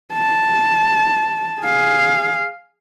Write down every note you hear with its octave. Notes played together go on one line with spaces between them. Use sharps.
A5
G#4 F5